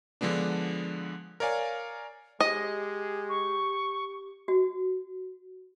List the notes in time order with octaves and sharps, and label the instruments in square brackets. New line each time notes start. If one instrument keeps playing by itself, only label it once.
[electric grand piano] D3 F3 G#3 B3 D4
A#4 C#5 D5 F5 G#5
[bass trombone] G#3 [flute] G4 [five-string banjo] D#5
[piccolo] C#6
[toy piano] F#4